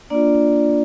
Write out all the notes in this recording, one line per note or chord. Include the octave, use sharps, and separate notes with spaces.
A#3 D4 F4 D5